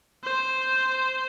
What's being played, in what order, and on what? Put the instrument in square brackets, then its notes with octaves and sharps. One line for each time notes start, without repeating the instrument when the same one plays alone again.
[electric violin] C5